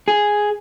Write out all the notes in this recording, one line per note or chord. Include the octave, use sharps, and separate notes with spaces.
G#4